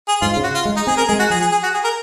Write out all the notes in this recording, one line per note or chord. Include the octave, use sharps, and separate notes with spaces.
G#4
G#2 F4
F4
C#3
F#4
F4
G#3
D#4
C4 G#4
A#4
G#3 G#4
F#4
F3 G#4
G#4
G#4
F#4
G#4
A#4